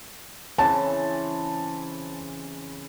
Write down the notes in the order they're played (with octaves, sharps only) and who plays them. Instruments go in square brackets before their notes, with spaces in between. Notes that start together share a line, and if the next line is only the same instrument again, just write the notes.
[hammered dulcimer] C#3 E3 C4 [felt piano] A5